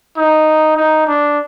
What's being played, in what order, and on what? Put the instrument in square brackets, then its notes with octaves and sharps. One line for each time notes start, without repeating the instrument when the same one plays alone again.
[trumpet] D#4
D#4
D4